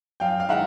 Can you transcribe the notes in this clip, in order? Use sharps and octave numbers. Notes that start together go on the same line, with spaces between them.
F#2 F5 G5
F5
D#3 G#3 E5 F#5